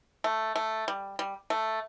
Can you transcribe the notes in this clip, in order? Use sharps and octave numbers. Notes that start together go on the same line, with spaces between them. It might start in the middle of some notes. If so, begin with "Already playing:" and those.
A3
A3
G3
G3
A3